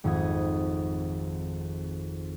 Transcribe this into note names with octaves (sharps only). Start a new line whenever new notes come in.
G#1 F2 F#5 B5 D#6 G#6